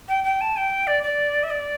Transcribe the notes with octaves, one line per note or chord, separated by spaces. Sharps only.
G5
G5
A5
G5
D5
D5
E5
D5